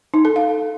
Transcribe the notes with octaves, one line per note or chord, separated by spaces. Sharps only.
D#4
A4
F5